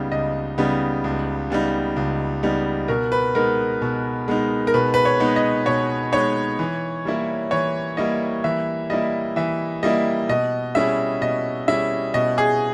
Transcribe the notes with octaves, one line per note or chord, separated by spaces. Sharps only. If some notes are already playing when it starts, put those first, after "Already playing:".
Already playing: C#2 C#3 G3 B3 D#4
C#2 D#5
C#3 G3 B3 D#4
C#2
C#3 G3 B3 D#4
C#2
C#3 G3 B3 D#4
B2 A#4
B4
G#3 B3 D#4 A#4
B2
G#3 B3 D#4
A#4
B2 B4
B4
C#5
G#3 B3 D#4
D#5
B2 C#5
G#3 B3 D#4 C#5
E3
G3 A#3 E4
E3 C#5
G3 A#3 E4 D#5
E3 E5
G3 A#3 E4 D#5
E3 E5
G3 A#3 E4 D#5
B2 D#5
G3 C#4 E4 G#4 E5
B2 D#5
G3 C#4 E4 G#4 E5
B2 D#5
G#4